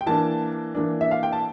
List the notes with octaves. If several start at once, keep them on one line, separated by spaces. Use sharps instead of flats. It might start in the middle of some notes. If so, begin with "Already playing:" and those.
G5
E3 A#3 D4 A5
E3 A#3 D4
E5
F5
G5
A5